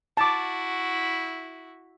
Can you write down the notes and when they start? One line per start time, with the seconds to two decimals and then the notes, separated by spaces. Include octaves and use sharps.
0.17 E4 F#4 A5 D6